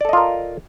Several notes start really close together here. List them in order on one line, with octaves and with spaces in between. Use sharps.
D5 A4 D#5 F4 A#4